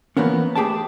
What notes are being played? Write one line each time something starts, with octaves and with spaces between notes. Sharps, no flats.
E3 F3 A#3 B3 C#4
A3 G4 G#4 G5 A5